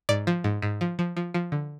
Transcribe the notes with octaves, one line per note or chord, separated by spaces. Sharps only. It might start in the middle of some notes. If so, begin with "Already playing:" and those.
G#2 D5
F3
G#2
G#2
F3
F3
F3
F3
D3